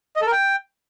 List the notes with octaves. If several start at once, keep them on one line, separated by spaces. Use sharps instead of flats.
D#5
A4
A#4
G5